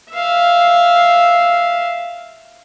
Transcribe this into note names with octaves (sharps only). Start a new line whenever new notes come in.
E5 F5